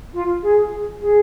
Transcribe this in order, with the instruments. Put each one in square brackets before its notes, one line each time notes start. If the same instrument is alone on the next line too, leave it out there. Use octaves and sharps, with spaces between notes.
[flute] F4
G#4
G#4